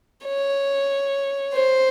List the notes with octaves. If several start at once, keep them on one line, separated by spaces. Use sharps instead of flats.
C#5
C5